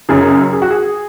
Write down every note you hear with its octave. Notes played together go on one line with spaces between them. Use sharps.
F#1 F#2 C#3 F#3 G#4
G#4
F#4
G#4